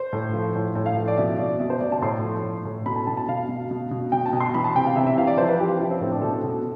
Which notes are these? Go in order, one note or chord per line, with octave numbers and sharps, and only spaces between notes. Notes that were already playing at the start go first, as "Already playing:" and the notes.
Already playing: C5
A2
F3
A2
A2
F5
F3
D5
B2 E5
B2 D5
B2 E5
C5
B2 D5
A5
A2 C6
F3
A2
A2
B2 B5
A5
B2 A5
A5
B2 F5
B2
B2
B2
B2 G5
A5
B2
C6
E3 B5
A5
C3 G5
F5
C3 E5
E5
E3 F5
D5
F3 C5
B4
F3 G4
F3 E4
C4
A2 C4
D4
B2 A4
B2